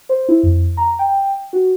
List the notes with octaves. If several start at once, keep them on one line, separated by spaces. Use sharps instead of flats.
C5
E4
F2
A#5
G5
F#4